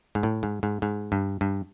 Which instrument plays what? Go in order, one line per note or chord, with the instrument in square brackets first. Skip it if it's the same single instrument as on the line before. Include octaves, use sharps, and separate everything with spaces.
[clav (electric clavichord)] G#2
A2
G#2
G#2
G#2
G2
G2